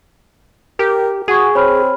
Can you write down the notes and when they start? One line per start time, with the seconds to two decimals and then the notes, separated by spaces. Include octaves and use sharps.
0.79 G4 A#4
1.28 F#4 G#4 C#6 G#6
1.55 C4 C#5 B5 F6